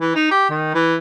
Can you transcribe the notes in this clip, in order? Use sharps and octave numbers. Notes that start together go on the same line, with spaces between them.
E3
D#4
G4
D#3
E3